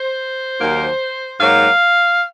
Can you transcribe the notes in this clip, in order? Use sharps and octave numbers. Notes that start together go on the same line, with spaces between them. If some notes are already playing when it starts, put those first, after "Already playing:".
Already playing: C5
D#2 D#3 F#3 A#3
G#2 F#3 A#3 F5